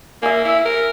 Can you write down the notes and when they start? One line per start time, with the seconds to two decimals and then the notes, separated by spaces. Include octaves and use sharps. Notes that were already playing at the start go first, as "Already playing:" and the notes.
0.23 A#3 E5 G#5
0.45 E4 E5
0.65 A#4